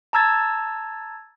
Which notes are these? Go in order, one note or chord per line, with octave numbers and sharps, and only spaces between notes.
A5 A#5 E6 G#6 A6